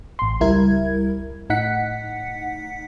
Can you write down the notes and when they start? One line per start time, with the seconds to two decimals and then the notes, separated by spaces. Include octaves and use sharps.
0.19 A1 C6
0.41 C#2 G3 E4 A#4 G#6
1.50 A2 D#4 F#5 B6 C#7